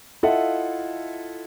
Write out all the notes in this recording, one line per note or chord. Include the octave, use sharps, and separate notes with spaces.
E4 F4 A4 D#5 E5 F#5